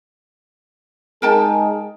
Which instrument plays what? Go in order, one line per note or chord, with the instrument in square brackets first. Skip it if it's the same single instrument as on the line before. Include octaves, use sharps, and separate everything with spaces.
[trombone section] G#3 D#4 G#4 [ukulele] A#4 G5 A5